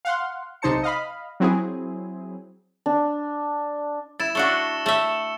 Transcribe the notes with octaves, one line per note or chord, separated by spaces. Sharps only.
F5 F#5 C6
B1 C3 D#4 C5 A5 C#7
D#5 F5 B5
F#3 C4 E4 G#4
D4
E4 A6 E7
A3 D4 F#4 E6 C#7 G7
A3 E5